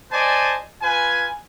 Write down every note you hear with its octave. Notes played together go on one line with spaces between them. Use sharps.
C5 D5 D#5 G#5 A5
F4 B4 G#5